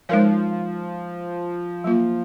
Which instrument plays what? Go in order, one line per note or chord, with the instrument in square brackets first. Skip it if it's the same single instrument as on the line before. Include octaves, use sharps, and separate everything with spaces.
[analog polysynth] F3 [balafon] G#3 D#4 A#4 C#5
[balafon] F#3 A#3 F4